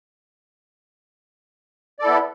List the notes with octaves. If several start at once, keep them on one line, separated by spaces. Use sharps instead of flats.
B3 E4 A4 D5